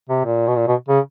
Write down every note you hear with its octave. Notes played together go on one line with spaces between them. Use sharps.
C3
A#2
B2
A#2
B2
C#3